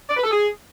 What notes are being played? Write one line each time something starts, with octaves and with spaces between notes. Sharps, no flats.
D5
B4
A4
G#4